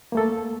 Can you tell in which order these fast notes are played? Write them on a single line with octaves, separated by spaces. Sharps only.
A#3 A3 A4